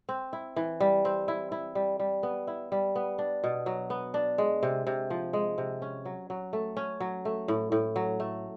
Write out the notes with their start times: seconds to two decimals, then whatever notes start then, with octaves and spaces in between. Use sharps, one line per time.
0.09 C4
0.33 E4
0.56 E3
0.80 G3
1.05 C4
1.28 E4
1.52 E4
1.75 G3
2.00 G3
2.23 B3
2.47 E4
2.72 G3
2.95 B3
3.18 D4
3.44 B2
3.66 F#3
3.90 B3
4.14 D4
4.38 G#3
4.63 C3
4.87 C3
5.10 F3
5.33 G#3
5.58 C3
5.82 C#4
6.05 F#3
6.30 F#3
6.53 A3
6.77 C#4
7.00 F#3
7.25 A3
7.48 A2
7.72 A2
7.96 F#3
8.20 A3